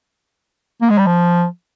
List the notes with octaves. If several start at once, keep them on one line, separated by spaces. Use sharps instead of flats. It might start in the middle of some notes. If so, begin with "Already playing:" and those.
A#3
G#3
G3
F3